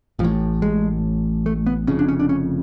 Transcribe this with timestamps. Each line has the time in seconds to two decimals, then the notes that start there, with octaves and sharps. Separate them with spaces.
0.19 A1 F3
0.24 A2
0.62 G#3
1.46 A3
1.66 B3
1.87 F1 F2 C#3 C#4
1.99 D4
2.09 C#4
2.20 D4
2.29 C#4